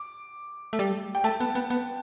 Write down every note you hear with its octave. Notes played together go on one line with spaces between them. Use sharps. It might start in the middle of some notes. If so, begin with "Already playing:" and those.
Already playing: D6
A3
G3
G5
A3 A5
B3
B3
B3